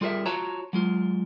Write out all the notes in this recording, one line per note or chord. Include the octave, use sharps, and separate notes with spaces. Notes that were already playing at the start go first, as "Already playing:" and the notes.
G3 F4 G#4 A#4 C#5 E5
F4 F#4 C#5 A5 A#5
F#3 G#3 F4